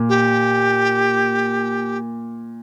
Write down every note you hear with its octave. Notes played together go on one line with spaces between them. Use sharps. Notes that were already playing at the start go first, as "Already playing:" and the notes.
Already playing: A#2
G4